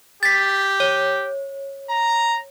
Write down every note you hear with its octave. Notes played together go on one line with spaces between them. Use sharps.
G4 A6 B6
C#5
A#5